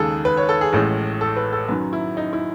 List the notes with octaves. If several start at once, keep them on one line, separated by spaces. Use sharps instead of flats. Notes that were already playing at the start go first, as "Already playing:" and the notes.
Already playing: D#2 C#3 G#3 G#4 A4
B4
C#5
A4
G#4
A1 A2 G#3
A4
B4
A4
F#2 D#3 F#3 B4
E4
D#4
E4